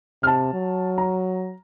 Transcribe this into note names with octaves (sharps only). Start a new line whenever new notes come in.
C3 A5 F6
F#3
A#5